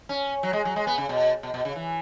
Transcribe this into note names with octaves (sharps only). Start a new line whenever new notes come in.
C#4
F#3
G#3
F#3
G#3
B3
C#3
B2
B2
B2
C#3
E3